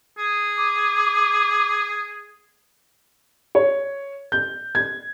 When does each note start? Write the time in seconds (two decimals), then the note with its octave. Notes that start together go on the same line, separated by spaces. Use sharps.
0.18 G#4
0.57 D6
3.55 C#5
4.32 G6
4.75 G#6